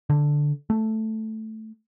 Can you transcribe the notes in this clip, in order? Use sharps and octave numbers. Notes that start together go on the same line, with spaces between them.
D3
A3